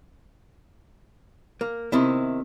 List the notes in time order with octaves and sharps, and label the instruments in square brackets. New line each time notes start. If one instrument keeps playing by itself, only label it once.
[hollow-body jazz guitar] A#3
[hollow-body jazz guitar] C3 D#3 E4 [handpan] B3 C4